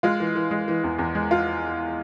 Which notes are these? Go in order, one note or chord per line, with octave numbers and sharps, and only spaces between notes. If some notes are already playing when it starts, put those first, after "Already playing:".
G#3 F4
E3
E3
G#3
E3
E2
E2
G#3
F4